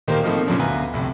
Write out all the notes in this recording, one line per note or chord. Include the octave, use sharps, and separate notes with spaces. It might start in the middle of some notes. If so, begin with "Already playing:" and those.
D#1 D#3 A#3 G4 C5
A2 C3 F3 A3 A#3 D#4
F#2 A#2 C#3 F3 F#3 D4
D2 B3 B4 F5 G#5 A#5
C2 F2 A2